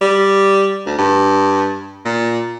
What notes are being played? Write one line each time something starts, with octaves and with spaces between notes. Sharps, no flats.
G3
D2
G2
A#2